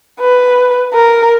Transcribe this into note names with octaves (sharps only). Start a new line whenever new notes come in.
B4
A#4